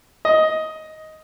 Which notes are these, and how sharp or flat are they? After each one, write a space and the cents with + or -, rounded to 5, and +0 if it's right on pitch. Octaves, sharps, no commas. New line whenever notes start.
D#5 +10